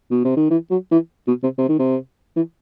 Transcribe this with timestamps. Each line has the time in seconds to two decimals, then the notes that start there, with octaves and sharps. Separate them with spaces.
0.11 B2
0.24 C3
0.37 D#3
0.50 E3
0.70 F#3
0.91 E3
1.27 B2
1.43 C3
1.58 C3
1.69 D#3
1.79 C3
2.36 E3